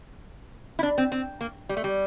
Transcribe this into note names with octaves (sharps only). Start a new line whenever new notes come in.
E4
D4
C4
C4
A#3
G3
A3
G3